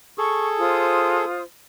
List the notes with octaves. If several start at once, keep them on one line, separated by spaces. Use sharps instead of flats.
G#4 A4 C#6
F4 C5 D#6